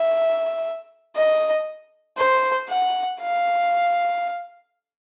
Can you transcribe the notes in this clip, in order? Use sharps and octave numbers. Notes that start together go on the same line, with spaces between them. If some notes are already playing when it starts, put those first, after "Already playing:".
Already playing: E5
D#5
C5
F#5
F5